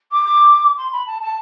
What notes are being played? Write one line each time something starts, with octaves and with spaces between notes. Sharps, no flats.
D6
C6
B5
A5
A5